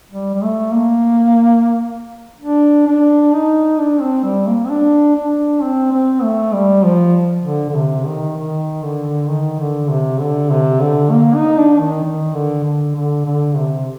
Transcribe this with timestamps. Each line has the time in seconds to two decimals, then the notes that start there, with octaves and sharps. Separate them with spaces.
0.12 G3
0.34 G3
0.43 A3
0.73 A#3
2.41 D4
2.87 D4
3.33 D#4
3.78 D4
4.01 C4
4.24 G3
4.47 A#3
4.65 C4
4.70 D4
5.15 D4
5.62 C4
5.92 C4
6.23 A3
6.53 G3
6.84 F3
7.44 D3
7.69 D3
7.75 C3
8.06 D#3
8.36 D#3
8.83 D3
9.28 D#3
9.59 D3
9.90 C3
10.20 D3
10.50 C3
10.80 D3
11.11 A#3
11.35 D#4
11.57 D4
11.80 D#3
12.03 D#3
12.34 D3
12.64 D3
12.95 D3
13.25 D3
13.56 C3